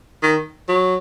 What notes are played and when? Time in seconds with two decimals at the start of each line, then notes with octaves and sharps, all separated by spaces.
0.23 D#3
0.68 F#3